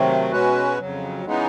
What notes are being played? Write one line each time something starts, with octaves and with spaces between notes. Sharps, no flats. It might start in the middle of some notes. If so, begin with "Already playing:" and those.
Already playing: C3 D#3 F#3 A3 C4
B2 G#3 C#4 F#4 B4
F2 C#3 F#3
C#3 E3 G#3 B3 D#4